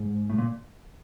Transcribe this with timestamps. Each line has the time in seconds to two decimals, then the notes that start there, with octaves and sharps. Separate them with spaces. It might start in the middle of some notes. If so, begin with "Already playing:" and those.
Already playing: G#2
0.30 A2
0.38 A#2